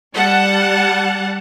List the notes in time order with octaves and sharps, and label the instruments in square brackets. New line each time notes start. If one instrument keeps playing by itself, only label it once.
[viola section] G3 F#5 A5